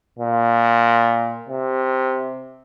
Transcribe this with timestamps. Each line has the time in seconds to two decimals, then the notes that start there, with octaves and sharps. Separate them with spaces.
0.19 A#2
1.49 C3